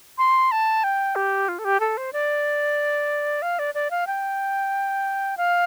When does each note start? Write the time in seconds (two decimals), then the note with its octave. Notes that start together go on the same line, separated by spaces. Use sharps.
0.18 C6
0.52 A5
0.84 G5
1.16 G4
1.49 F4
1.59 A4
1.65 G4
1.80 A4
1.97 C5
2.13 D5
3.42 F5
3.59 D5
3.75 D5
3.91 F5
4.07 G5
5.37 F5